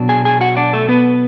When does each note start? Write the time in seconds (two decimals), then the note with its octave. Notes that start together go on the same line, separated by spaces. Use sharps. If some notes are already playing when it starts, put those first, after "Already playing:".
Already playing: B2 F#3 B3 D4
0.09 G#4 G#5
0.25 G#4 G#5
0.41 F#4 F#5
0.57 D4 D5
0.73 A3 A4
0.89 B3 B4